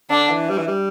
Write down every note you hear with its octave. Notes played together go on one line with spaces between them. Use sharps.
D3 D4
E3
G3
E3
G3